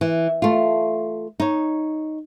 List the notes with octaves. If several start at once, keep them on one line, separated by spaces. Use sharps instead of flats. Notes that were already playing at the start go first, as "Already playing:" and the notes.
E3
A3 F4
D#4 C#5